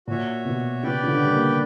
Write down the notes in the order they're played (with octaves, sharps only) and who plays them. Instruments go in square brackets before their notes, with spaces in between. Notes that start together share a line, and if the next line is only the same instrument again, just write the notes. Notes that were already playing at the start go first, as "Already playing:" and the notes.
[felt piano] A#2 [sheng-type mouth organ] F#4 C#5 E5
[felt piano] B2
[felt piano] C#3 [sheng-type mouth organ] G4 B4 D5 G5
[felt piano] C#3
D3
G3
A#3